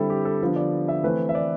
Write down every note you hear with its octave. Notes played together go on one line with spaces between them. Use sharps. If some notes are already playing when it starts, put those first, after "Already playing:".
Already playing: D3 G3 C4 E4 A4
G4
A4
D3 F3 B3
D5
E5
E3 A3 C4 B4
E5
D5